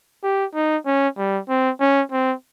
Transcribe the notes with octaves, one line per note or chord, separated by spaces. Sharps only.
G4
D#4
C#4
G3
C4
C#4
C4